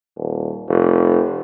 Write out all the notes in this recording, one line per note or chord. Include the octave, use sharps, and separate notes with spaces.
D#1
F1